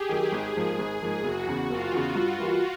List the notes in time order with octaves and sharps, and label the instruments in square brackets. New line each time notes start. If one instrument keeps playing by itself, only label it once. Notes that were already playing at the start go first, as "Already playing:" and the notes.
Already playing: [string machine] G4 G#4
[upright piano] D#3 F#3
[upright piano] G#1 [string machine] G#4
[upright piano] G#2 F3 A#3
G#1
G#2 F3 A#3
[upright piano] F#1 [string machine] F#4
[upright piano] E2 C#3
[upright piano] F#1 [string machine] F4
[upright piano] E2 C#3
G2
E3 G3 A#3